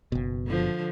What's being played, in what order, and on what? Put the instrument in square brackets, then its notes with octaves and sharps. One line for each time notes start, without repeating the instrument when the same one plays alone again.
[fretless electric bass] F#1 B2
[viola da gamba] D3 F3